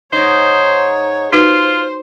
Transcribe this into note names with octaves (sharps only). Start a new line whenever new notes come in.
G#2 D#4 C5 C#5
D#4 F4 F#4 B4 C5